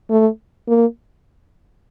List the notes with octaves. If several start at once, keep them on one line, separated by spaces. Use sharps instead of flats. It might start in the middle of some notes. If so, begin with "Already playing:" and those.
A3
A#3